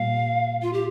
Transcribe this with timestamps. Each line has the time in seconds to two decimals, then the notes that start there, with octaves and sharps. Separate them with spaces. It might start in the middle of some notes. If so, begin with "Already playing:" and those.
Already playing: A#2 G3 A#3 F5
0.62 F4
0.73 G4